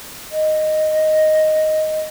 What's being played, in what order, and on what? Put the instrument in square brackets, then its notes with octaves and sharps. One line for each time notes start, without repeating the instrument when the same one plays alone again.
[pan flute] D#5